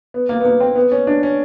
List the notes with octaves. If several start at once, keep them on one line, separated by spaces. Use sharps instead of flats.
B3
A#3
B3
A#3
C4
B3
C#4
D4
C#4